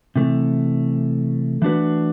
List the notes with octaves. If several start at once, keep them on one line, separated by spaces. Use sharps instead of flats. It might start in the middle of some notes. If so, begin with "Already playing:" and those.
C3 E3 A3
E3 A3 D4 F#4 B4